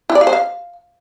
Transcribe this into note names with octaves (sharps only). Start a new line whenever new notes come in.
E4
D5
F5
C5
F5